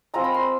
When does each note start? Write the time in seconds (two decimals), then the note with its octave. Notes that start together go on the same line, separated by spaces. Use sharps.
0.14 G#3 C4 F4 A#5
0.24 B5
0.34 C6